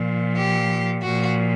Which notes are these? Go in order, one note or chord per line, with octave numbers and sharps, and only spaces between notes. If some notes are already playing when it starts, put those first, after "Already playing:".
Already playing: A#2 F3
G4
A#2 F3 F#4